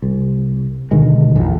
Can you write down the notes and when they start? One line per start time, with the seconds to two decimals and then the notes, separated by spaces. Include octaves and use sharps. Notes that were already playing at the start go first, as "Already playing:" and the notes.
0.02 C2
0.91 D2 B2 D#3 G#3
1.36 A#1 F2 E3